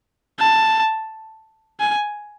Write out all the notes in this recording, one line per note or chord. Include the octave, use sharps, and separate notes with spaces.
A5
G#5